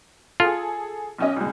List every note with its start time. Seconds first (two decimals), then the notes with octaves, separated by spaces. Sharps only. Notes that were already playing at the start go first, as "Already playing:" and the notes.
0.40 F4 G#4 A4
1.18 B1 C#4 D#5
1.36 C2 G#3